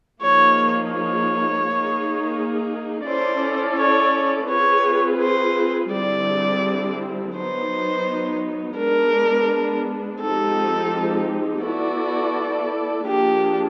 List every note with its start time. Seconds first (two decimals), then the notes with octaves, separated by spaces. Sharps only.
0.21 F3 A#3 D#4 G#4 C#5
0.93 C#5
1.64 A#3 D#4 G#4
3.07 C#4 E4 A4 C5 D5
3.79 C#5
4.50 C4 F4 G#4 B4 C#5
5.22 C5
5.93 D3 G3 C4 E4 G#4 D5
7.35 F#3 B3 D#4 C5
8.78 G#3 B3 D4 A#4
10.20 F3 G#3 C4 D#4 G4 A4
11.63 B3 E4 F#4 A4 D5
13.06 F3 A#3 D4 F4 G4 G#4